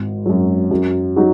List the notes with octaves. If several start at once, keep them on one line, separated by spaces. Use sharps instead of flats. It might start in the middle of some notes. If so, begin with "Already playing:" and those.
Already playing: G#1
F#2 F#3
F#2
F#3 D#4 F#4